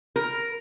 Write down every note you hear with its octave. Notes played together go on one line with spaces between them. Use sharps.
A#4